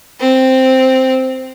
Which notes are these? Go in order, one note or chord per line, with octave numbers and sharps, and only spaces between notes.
C4